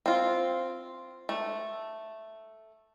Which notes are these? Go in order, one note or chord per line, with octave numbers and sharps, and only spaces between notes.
C4 F4
A3